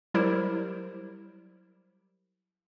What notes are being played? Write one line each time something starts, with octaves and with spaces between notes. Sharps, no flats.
F#3 G3 E4 G4 A#4 C5